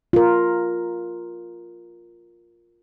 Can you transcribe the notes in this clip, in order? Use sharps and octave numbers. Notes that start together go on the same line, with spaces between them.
F4 A#4